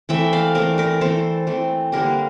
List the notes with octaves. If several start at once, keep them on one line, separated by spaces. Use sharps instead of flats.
E3 A3 C4 E5 G5
D5 F5
E3 A3 C4 A#4 D5
A#4 D5
E3 A3 C4 A4 C5
E3 A3 C4
D3 G3 A#3 D4 G4 A#4